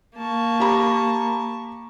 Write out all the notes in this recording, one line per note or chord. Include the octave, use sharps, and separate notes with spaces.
A#3 A5 C#6
G4 A#5 B5